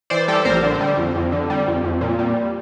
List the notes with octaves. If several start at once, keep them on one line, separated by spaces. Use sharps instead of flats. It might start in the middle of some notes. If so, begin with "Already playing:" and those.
E3 C5 D5
G3 G4 A4
A#1 A#4 C5
D3
G3
F2
F2
D3
G3
F2
F2
A#2
G3